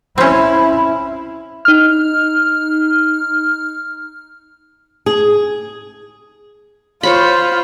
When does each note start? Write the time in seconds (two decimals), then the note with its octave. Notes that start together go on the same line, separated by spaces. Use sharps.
0.18 C4 C#4 E4
1.65 D#4 F6
5.06 G#4
7.03 F4 C5 C#5 B5